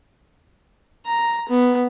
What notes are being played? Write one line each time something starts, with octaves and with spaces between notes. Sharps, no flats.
A#5
B3